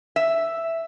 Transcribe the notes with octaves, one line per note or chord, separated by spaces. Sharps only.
E5